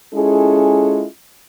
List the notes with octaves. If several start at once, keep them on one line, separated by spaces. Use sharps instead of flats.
G#3 C#4 E4 F4 G#4 A4